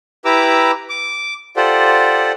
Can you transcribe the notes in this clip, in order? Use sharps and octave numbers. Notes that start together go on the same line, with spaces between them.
E4 G4 B4 A#5 D6 E6
D6
F4 G4 A4 C5 D5 F#5